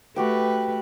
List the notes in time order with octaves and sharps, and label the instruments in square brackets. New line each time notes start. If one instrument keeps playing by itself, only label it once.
[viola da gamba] A3 B4 [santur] F#4 G4 G5